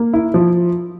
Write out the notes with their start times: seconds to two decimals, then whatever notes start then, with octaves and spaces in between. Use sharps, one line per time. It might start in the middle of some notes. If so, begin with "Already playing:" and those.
Already playing: A#3
0.13 E4
0.34 F3